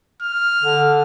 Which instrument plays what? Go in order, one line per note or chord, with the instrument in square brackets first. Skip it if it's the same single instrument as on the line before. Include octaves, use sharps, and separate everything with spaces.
[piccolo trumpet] F6
[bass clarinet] D3